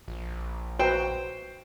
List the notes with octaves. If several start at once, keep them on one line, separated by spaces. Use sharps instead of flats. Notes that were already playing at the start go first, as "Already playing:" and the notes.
A#1
F#4 B4 C5 G5 A#5